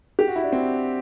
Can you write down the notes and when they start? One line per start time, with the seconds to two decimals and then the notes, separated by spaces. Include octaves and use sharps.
0.19 G4
0.28 F#4
0.36 E4
0.44 D4
0.52 C4